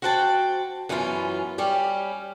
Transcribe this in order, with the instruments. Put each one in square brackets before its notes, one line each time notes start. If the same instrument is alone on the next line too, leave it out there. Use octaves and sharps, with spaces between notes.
[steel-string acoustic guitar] F#4 C5 F#5 G5 A5
F#2 E3 B3 C#4 F4
G3 C#4 G4